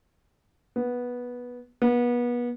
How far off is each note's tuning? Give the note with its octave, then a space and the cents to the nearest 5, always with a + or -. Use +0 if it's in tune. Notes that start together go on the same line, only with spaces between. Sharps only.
B3 -10
B3 -30